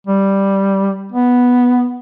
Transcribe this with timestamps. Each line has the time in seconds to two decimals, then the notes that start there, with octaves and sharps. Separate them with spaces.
0.07 G3
1.12 B3